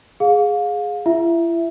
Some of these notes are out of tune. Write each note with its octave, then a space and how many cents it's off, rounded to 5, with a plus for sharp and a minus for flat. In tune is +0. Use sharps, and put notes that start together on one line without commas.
G#4 +0 F5 +30
E4 +40 E5 +5